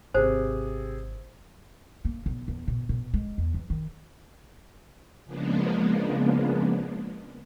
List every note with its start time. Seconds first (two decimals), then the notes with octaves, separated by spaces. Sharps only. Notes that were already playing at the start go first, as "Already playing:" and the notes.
0.14 G#1 C3 G#4 C5
2.05 A#3
2.26 B1
2.48 E2
2.67 B2
2.89 B2
3.14 G#3
3.38 E2
3.54 E3
3.70 D#3
5.26 C#3 F3 G#3 A#3 B3 D4